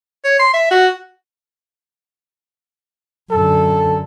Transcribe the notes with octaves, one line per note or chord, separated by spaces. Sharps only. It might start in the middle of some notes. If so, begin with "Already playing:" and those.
C#5
C6
E5
F#4
F#2 D3 A4